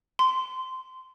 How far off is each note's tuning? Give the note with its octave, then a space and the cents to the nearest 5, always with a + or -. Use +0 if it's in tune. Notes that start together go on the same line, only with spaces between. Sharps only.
C6 -15